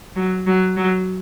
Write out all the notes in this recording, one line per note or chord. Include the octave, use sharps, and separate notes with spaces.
F#3
F#3
F#3